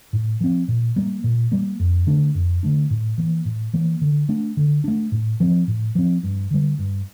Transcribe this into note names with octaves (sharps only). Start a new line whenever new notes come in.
A2
F3 C4
A#2
G3 A#3
A#2
G3 A#3
F2
D3 A3 D4
F2
D3 A3 D4
A2
E3 A#3
A2
E3 A#3
D3
A3 D4
D3
A3 D4
A2
F3 C4
A2
F3 C4
G2
D3 G3
G2